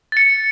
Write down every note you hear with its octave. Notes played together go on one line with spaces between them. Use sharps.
A6 C#7